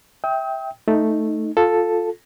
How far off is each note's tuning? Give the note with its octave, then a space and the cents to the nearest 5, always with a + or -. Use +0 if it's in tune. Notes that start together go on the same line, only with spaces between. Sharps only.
E5 -15 G5 +0 D#6 +45
A3 +0 D#4 +0
F4 +15 A4 +0